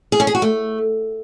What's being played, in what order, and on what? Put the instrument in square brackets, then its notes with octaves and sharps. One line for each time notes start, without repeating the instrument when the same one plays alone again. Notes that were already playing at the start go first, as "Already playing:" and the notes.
[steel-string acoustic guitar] G#4
C#4
G#4
F#4
A3